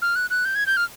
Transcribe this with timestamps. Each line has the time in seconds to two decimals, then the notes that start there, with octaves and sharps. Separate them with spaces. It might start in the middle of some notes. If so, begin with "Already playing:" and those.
0.02 F6
0.16 F#6
0.30 F#6
0.45 G6
0.55 G#6
0.67 G6
0.77 F6